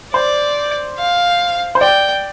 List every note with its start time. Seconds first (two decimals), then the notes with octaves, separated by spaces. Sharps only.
0.14 C5 D5
0.98 F5
1.75 C5
1.81 D5 G5